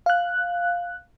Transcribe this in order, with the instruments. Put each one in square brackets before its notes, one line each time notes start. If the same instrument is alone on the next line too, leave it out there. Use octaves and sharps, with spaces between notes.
[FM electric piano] F5 F#6